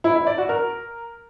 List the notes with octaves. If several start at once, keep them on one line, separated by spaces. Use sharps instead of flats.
E4
E4
D5
F#4
A#4